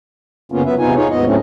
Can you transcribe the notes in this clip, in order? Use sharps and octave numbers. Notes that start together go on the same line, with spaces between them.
F#2 C#3 A#3 B3 C#4 F4
F#3 B3 B4 E5
E2 C3 B3 D#4 F4 G#5
D#4 F4 G#4 C#5
D#2 G#2 B3 D#5
A2 F#3 A3 C4 C#4